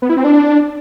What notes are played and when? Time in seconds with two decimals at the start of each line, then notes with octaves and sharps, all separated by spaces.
0.02 B3
0.09 E4
0.17 C4
0.24 D4